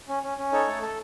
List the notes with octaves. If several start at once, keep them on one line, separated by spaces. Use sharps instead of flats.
C#4
C#4
C#4
D#4 A4 C#5
A3
A4